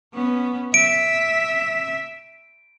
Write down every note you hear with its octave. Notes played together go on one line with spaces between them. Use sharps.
B3 C#4
E5 D7